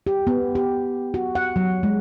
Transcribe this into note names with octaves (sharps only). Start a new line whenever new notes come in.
G4
B3
G4
F#4
F#5
F#3
G#3